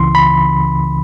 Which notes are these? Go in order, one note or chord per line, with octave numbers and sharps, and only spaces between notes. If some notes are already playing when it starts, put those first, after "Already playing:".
Already playing: C#2 C#3 E3 C6
B5